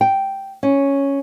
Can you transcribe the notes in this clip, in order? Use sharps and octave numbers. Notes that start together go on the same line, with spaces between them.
G5
C#4